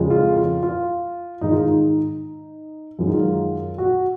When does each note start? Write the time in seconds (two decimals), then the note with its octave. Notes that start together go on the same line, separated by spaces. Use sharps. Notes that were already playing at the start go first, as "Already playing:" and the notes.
Already playing: F2 C#3 F3 G#3
0.10 F4
0.37 F4
0.63 F4
1.41 G#2 D#3 G#3 D#4
1.51 F4
1.63 D#4
2.99 F#2 D#3 G#3 F4
3.07 D#4
3.13 F4
3.78 F#4